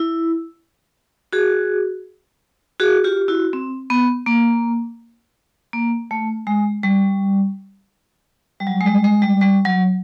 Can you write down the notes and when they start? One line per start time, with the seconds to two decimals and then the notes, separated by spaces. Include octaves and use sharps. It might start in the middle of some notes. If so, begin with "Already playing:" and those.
Already playing: E4
1.33 F#4 G#4
2.80 F#4 G#4
3.04 F4 G4
3.28 E4 F#4
3.53 C4
3.90 B3
4.26 A#3
5.73 A#3
6.11 A3
6.47 G#3
6.83 G3
8.60 G3
8.67 F#3
8.81 G#3
8.86 G3
9.04 G#3
9.22 G3
9.41 G3
9.65 F#3